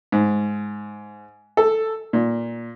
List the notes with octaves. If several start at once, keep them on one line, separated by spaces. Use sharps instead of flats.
G#2
A4
A#2